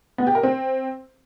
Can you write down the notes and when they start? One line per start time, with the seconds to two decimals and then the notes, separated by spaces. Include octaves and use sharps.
0.18 B3
0.27 G4
0.35 A#4
0.43 C4